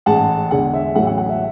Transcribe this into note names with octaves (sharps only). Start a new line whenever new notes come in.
A1 G#2 G#3 F#5 A5
E2 D3 G#3 F#5
E5
A1 A2 F#3 A3 F#5
F#5
F#5
E5